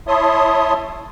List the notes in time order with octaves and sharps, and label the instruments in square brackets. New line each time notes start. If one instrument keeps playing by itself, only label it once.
[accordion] E4 C#5 E5 A5 C6 D#6